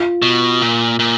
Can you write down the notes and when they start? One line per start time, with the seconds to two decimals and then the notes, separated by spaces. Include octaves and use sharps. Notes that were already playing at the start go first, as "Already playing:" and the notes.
Already playing: F4
0.22 B2
0.62 A#2
0.99 A#2